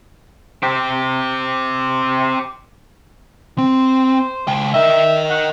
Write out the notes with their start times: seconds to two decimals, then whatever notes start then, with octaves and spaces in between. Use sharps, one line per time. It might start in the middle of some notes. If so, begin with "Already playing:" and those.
0.63 C4 G4
3.58 C4 C5
4.48 C#2 G5
4.74 A#4 D#5 E5
5.30 F#5